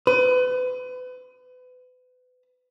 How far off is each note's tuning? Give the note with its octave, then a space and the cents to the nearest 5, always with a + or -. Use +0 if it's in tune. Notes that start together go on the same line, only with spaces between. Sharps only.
B4 +35